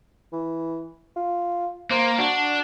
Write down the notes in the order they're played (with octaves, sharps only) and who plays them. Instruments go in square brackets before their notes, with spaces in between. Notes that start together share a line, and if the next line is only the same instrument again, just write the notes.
[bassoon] E3
F4
[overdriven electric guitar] A#3 [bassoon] C5
[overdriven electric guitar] D4 [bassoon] F#4